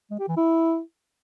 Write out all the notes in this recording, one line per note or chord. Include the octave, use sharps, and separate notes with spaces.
G#3
G4
E3
E4